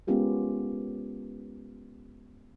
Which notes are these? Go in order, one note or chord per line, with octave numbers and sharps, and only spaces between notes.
G#3 B3 C#4 F4 G4 A#4